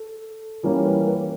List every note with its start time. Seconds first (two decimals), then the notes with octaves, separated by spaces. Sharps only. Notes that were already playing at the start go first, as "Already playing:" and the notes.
Already playing: A4
0.63 E3 G3 A#3 C#4 A#4
0.86 B4
1.07 B4